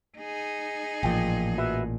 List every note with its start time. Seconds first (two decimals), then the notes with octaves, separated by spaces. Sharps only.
0.18 D#4 G#4
1.03 A1 A#2 F3 G5
1.58 F#4 B4 E5